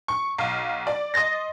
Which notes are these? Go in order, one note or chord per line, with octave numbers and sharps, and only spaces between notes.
C#6
B1 F5
D5
D#5 C6 A6 A#6